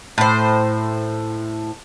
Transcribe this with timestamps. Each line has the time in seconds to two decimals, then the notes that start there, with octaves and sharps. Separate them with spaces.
0.18 A2 C5